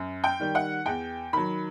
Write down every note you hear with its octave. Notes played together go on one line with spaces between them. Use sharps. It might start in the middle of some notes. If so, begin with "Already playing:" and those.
Already playing: F#2
G5
D#3 G3
F#5
E2 G5
D#3 F#3 B5